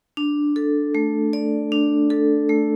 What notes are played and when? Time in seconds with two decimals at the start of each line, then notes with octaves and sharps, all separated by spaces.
0.17 D4
0.56 A4
0.95 A3
1.33 D5
1.72 D4
2.10 A4
2.49 A3